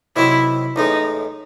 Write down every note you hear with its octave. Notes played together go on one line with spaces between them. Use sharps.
C3 D#3 F#3 C4 E4
A1 A2 G#3 D#4